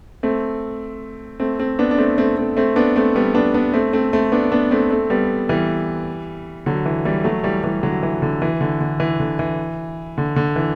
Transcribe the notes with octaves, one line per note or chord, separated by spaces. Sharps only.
A3 C4
A3 C4
A3 C4
B3 D4
D4
A3 C4
A3 C4
A3 C4
A3 C4
B3 D4
A3 C4
G3 B3
B3 D4
B3 D4
A3 C4
A3 C4
A3 C4
B3 D4
B3 D4
A3 C4
A3 C4
G3 B3
E3 G3
D3 F#3
E3
E3 G3
F#3 A3
E3 G3
E3 G3
D3 F#3
E3
D3
E3
D3
D3
E3
D3
E3
D3
D3
E3